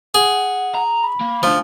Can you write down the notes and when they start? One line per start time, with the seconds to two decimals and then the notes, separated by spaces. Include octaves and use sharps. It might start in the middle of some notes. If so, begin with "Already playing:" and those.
0.14 G#4 F#5
0.75 A#5
1.03 B5
1.21 A#3
1.43 F3 A3 D4